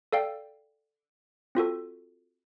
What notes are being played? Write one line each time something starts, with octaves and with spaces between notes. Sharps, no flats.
A4 D5 F5 G5
C4 F4 F#4 A4